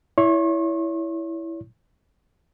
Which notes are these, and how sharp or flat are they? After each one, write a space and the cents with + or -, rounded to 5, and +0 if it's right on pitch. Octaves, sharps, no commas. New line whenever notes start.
E4 +0 C#5 +35 C#6 -45